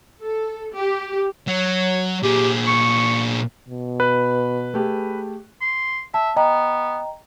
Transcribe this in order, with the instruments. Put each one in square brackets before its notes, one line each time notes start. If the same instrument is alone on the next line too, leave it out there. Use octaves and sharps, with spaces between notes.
[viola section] A4
G4
[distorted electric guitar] F#3 [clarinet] C#5
[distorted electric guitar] A#2 G#4 [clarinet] G4
[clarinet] C#6
[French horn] B2
[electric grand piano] B4 [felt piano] F#6
[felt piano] A3 G4 G#4
[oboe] C6
[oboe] E5 [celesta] A5
[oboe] B3 [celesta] D#5 G5 A#5